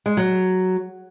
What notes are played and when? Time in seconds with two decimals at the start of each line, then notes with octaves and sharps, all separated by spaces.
0.06 G#3
0.17 F#3